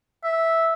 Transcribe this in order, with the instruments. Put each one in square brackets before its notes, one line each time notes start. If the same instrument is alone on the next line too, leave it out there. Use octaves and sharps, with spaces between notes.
[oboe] E5